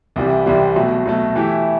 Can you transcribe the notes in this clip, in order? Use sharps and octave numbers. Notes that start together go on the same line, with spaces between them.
C2 C3 E3 G3
C2 C3 E3 G3
B2 F#3 A3
B2 F#3 A3
E3 A3 E4 G4